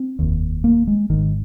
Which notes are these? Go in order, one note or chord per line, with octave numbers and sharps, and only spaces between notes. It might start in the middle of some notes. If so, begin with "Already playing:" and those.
Already playing: C4
F1 D#2
A#3
G#3
G#1 G#2 D#3